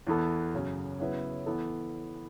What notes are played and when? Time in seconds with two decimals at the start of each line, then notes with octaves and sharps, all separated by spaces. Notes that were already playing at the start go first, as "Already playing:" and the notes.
0.07 E2 E3 B3 A4
0.54 F#2 C#3 F#3 C#4
1.00 C#3 F#3 B3 E4 B4
1.46 E3 B3 A4